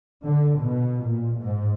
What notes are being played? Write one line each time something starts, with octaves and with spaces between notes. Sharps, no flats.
D3
B2
A#2
G#2